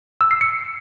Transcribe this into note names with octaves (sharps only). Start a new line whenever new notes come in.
E6
C7
C#7